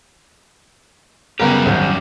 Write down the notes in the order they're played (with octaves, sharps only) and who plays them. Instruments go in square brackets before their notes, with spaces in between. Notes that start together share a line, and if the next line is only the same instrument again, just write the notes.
[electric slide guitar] F#2 G3 G4 [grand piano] C#3 B3 A#4
[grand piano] G#1 G#2